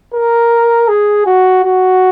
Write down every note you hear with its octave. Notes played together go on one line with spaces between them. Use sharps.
A#4
G#4
F#4
F#4